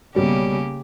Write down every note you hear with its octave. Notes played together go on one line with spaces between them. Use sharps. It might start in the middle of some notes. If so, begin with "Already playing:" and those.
B1 C#3 G3 A#3 C#4 G4